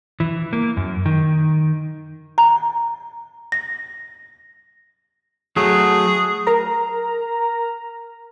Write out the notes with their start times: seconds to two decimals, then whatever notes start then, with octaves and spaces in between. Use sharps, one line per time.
0.20 E3
0.53 A#3
0.77 F#2
1.06 D#3
2.38 A#5
3.52 A#6
5.56 F#3 A3 G#4
6.47 A#4 A#5